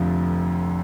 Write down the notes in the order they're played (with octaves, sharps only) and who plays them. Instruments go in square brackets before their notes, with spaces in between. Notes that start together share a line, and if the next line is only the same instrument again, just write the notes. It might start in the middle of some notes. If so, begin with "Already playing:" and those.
Already playing: [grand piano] F1 F2 D3 F3